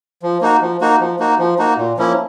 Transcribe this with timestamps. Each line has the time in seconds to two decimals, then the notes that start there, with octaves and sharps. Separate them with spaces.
0.23 F3
0.41 A#3 D#4 F#4
0.62 F3
0.81 A#3 D#4 F#4
1.00 F3
1.19 A#3 D#4 F#4
1.39 F3
1.58 A#3 D#4 F#4
1.77 A#2
1.97 F3 A#3 C#4 E4